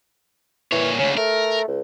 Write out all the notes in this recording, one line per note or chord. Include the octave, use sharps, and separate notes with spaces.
A#2 E3 C#5
D2 C#3 C#4
A3 A#4
C#2